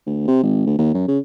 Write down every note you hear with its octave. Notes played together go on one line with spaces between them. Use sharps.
D2
C3
G#1
D2
D#2
F#2
C#3